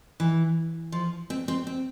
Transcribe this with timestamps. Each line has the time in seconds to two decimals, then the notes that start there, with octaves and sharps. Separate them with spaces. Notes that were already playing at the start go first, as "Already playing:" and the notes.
0.20 E3
0.92 F3
1.30 C4
1.48 C4
1.67 C4